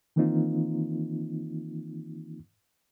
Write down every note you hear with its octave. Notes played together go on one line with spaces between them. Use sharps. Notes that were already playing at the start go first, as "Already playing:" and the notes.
D#3 E3 A#3 C4 D#4 F4